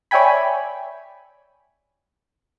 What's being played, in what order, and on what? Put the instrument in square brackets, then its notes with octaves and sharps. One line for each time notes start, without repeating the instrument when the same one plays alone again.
[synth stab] C#5 D5 E5 G5 G#5 B5